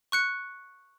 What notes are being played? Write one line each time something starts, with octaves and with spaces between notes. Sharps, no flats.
C#6 F#6 C#7